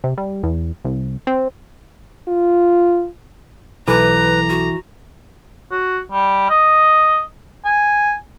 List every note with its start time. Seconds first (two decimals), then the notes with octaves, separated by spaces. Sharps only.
0.04 C3
0.18 G3
0.43 E2
0.85 C2
1.27 C4
2.28 F4
3.88 B1 E3 A4 B4 A#5 D6
4.49 F#4
5.71 F#4
6.12 G3
6.50 D#5
7.65 G#5